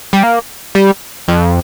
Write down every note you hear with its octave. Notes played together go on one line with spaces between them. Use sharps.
G3
A#3
G3
F2